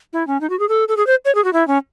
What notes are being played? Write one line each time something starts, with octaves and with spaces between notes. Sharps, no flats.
E4
C#4
D#4
F#4
G#4
A4
A4
G#4
C5
C#5
G#4
F#4
E4
C#4